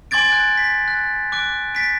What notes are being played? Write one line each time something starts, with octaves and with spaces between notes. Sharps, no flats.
G#5 C6 D6 G#6 A6 D7
F#6
B6
F#6
D6 F#6 D7
A6 B6 D7